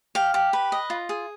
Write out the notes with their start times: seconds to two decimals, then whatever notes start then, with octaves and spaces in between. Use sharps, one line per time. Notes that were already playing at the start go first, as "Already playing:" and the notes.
0.15 G4 F5
0.34 G4
0.53 B4
0.72 D#5
0.90 F4
1.09 G#4